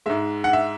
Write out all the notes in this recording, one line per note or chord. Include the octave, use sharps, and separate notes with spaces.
G#2 G#3 E5
F#5
E5